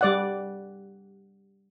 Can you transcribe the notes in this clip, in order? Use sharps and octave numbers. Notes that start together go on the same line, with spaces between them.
G3 D5 F#5